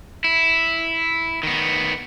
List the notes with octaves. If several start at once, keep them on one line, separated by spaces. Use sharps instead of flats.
E4
D#3 B3